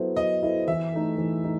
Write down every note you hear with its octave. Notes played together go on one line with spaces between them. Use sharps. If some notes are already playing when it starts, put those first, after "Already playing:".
Already playing: F#3 B3 E4 A4 C5
F#3 D#5
B3 E4 A4 C5
E3 E5
A3 D#4 A4
E3
A3 D#4